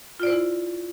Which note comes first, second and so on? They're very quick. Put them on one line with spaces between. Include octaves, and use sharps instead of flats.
F4 D5 C5 E4